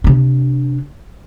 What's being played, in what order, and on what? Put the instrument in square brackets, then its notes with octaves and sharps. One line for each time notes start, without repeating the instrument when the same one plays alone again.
[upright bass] C3 D4